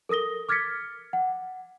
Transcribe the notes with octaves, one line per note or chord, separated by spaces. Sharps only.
A4 A#4 D#6 A#6 G7
D6 F6 G#6 A6 B6 C#7
F#5